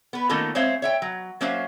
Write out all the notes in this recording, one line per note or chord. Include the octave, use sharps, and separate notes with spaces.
B3 B4
D#3 A3 A#3 C#4 F4 A4
G#3 C4 C5 C#5 E5 F5
C#5 E5 G5
F#3
F#3 A#3 C#4 C5 E5 F5